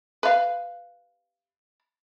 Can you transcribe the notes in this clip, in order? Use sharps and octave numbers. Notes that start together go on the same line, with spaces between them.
B4 F5